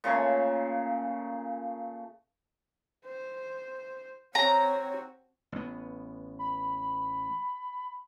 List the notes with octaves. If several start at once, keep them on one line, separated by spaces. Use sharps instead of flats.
A#2 C#3 A3 G#5
C5
C4 F#4 C#5 A#5
A1 B3
B5